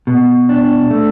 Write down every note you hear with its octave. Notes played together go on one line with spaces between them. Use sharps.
B2
D4
A3